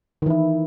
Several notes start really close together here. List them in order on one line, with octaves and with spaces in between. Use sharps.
D#3 E3 E4